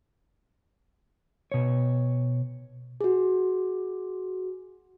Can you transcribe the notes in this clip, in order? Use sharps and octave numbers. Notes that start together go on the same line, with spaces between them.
B2 C#5
F#4 G#4